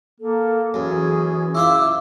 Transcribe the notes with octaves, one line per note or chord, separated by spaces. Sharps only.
A#3 A4
F#2 E3 C#4 G#4
E4 F4 E5 D6 E6